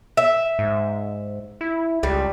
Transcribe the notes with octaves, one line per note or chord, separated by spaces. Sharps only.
E5
G#2
E4
C#2 G3